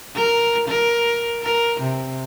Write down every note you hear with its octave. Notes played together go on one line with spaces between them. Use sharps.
A#4
A#4
A#4
C3